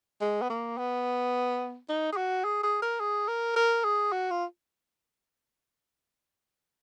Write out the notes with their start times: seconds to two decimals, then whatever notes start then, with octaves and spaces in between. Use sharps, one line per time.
0.21 G#3
0.42 B3
0.49 A#3
0.78 B3
1.89 D#4
2.12 G#4
2.17 F#4
2.44 G#4
2.63 G#4
2.82 A#4
3.00 G#4
3.28 A#4
3.56 A#4
3.84 G#4
4.12 F#4
4.31 F4